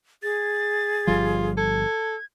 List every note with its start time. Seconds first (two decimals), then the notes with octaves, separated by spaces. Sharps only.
0.23 G#4 A6
1.07 G1 F3 G3 F4
1.57 A4 G#6